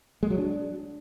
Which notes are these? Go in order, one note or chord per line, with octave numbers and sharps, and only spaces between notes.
G#3
F#3
D4